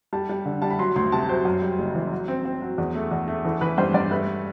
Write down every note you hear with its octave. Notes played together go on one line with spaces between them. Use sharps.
G3 A5
G3
D3
G3 A5
B5
F#3 C6
D2 C6
C3 A5
F#3 C5
F#2
G3
F#1
E3
F#3
C4
C4
F#3
E2
A3
E2
A3
E3 A4
E3 B4
G2 C5
G2 D5
A3 B4